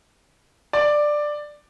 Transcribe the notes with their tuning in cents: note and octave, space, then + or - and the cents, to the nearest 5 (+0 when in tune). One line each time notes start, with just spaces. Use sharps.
D5 +10